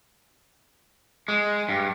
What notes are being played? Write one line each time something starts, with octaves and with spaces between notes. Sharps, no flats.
G#3
G2